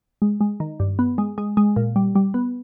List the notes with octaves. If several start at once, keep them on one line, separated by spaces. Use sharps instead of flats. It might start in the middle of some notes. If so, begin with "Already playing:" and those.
G#3
G#3
D#3
G2
B3
G#3
G#3
G#3
A#2
G3
G3
B3